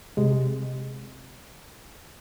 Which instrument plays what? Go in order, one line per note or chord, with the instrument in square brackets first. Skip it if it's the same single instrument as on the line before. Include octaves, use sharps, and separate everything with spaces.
[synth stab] C3 G#3